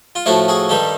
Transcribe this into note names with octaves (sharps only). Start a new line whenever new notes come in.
F4
A2 F3 A3 E4 F#4
F#4 G#4
G2 D#3 G3 G4 A4